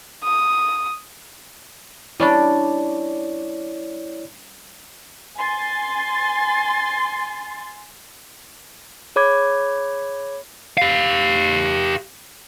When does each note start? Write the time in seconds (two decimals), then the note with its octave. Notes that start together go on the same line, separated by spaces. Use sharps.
0.24 D#6
2.20 G3 C#4 D4 E4 C#5 D5
5.37 G#5 C6 A6
9.16 G#4 C#5 B5 D6 G#6
10.78 G4 F5